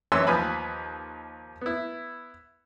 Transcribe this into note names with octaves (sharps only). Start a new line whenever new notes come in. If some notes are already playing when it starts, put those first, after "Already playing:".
F#2 E3 C#5 G#5 C6 E6
D#2 F3 B4 G#5 B5
B3 E4